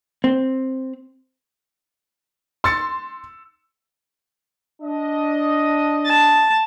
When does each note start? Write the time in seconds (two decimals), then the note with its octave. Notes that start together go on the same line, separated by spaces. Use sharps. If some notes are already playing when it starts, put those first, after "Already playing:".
0.24 C4
2.64 C6 E6 A6 C#7
4.82 D4 D#5
6.07 A5